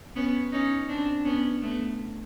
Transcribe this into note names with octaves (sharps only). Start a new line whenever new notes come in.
B3 C#4
C#4 D#4
C4 D4
B3 C#4
A3 B3